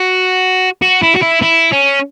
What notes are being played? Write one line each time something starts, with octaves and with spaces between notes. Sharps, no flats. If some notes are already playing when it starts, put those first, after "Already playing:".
Already playing: F#4
F#4
E4
F#4
E4
E4
C#4